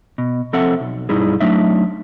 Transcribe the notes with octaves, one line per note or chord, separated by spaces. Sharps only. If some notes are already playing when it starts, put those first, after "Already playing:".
B2
C2 F3 C4 A4 E5 F#5
B1
B1 G2 G3 D#4 E4 G#4
F#3 A3 D4 D#4 E5